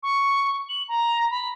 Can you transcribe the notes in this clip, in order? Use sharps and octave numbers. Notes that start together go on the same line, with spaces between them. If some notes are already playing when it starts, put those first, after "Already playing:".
C#6
F#7
A#5
B5